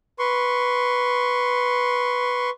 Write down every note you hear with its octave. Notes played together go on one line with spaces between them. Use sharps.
B4 C6 C#6